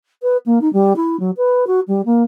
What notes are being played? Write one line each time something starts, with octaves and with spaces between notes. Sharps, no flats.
B4
A#3
D#4
G3
E4
F#3
B4
F#4
G3
A#3